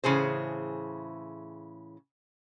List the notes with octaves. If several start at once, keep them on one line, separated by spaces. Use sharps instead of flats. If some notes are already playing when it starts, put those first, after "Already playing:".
A2 C#3 E3 G#4 C5